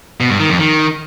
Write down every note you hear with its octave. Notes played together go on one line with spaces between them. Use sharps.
B2
G2
D#3
F2
D#3